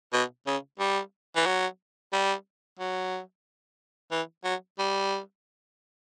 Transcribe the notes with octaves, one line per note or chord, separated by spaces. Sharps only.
B2
C#3
G3
E3
F#3
G3
F#3
E3
F#3
G3